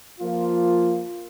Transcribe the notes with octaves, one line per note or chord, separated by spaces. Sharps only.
F3 A#3 F4